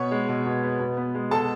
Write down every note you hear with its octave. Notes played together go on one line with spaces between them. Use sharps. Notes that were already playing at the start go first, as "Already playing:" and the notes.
Already playing: B2 B3 C#5 C#6
G#3
B2
B2
B3
B2
B3
G#3
B2 A4 A5